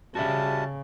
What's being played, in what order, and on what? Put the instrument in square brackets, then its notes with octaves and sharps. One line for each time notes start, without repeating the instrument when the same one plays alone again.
[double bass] C#3 [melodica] G3 A5 [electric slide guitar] F#4 G#4 E5